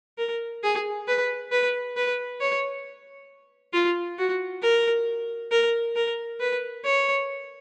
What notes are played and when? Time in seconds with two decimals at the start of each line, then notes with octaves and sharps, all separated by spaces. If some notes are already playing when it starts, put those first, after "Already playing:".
0.18 A#4
0.63 G#4
1.07 B4
1.51 B4
1.96 B4
2.41 C#5
3.73 F4
4.18 F#4
4.62 A#4
5.51 A#4
5.96 A#4
6.40 B4
6.84 C#5